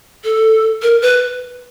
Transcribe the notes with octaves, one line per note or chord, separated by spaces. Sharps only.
A4
A#4
B4